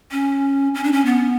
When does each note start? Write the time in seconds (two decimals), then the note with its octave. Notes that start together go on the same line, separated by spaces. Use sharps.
0.12 C#4
0.74 C#4
0.84 D4
0.92 C#4
1.05 B3